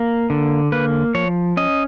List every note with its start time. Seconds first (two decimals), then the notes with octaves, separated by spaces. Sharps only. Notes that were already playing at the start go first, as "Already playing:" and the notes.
Already playing: A#3
0.30 D3
0.72 A#3 B4
1.14 F3 C#5
1.57 C#4 D#5